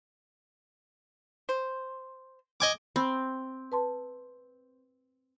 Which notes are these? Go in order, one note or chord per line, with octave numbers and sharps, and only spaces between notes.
C5
D#5 G#5 D6
C4 B5 E6
B4 A5 C6